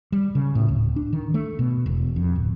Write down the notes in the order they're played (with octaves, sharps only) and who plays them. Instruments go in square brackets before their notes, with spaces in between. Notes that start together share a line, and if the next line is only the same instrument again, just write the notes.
[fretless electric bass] G3
C#3
A2
D1
D4
D#3
A3
B2
E1
F2
D1